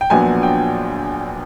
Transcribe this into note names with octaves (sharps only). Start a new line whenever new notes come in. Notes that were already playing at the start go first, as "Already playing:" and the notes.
G5
A#1 A#2 F#3 B3 D4 G#5
G5